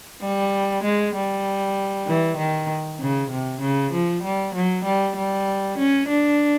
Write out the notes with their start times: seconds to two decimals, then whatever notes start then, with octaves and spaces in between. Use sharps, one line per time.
0.22 G3
0.83 G#3
1.15 G3
2.07 E3
2.38 D#3
3.00 C#3
3.31 C3
3.61 C#3
3.92 F3
4.23 G3
4.54 F#3
4.85 G3
5.16 G3
5.78 C#4
6.08 D4